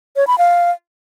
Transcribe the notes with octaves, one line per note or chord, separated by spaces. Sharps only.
C#5
B5
F5